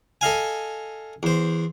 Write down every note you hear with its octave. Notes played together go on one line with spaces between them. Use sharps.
A4 D#5 F5 G#5
E2 C5